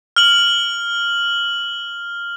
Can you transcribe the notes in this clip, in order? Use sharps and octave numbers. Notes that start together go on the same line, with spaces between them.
F6 F#7